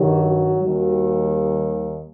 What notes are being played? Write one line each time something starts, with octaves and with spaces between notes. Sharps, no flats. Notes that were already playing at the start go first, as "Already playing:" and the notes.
Already playing: G2 D#3 F#3 G4
F#4
D#2 D#3 G3